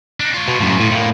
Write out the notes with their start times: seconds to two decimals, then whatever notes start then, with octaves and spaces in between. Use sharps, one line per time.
0.20 D4 D#4
0.34 F4 C#5
0.48 B2
0.61 F#2 A2
0.80 A2
0.91 A2 A#3